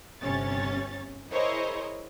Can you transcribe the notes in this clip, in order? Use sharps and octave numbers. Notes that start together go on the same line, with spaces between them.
G1 C3 C#4 C#5 A6
E4 G#4 A#4 C5 C#5 D#5